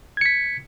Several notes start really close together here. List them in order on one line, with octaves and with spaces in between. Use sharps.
G#6 C#7 B6